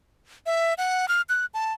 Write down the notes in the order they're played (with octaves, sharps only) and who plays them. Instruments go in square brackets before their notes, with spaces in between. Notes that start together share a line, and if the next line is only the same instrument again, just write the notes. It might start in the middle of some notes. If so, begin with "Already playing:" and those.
[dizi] E5
F#5
F6
F#6
A5